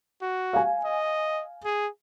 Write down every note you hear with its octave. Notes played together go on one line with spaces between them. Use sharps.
F#4
F5 G#5
D#5
G#4